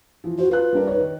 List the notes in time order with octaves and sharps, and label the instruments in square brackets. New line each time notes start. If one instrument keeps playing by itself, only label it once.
[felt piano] E3 F3
[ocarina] F#4 [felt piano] C5
[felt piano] F4 F#6 [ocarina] B4
[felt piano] G3 D4 A#4
D#4 C#5
D#3